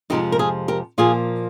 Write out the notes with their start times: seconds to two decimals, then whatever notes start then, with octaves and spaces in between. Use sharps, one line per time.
0.10 F2 C3 F3 G#3 D#4 G4
0.32 A#4
0.39 F4 G#4
0.68 G4 A#4
0.98 A#2 F3 A#3 F4 G#4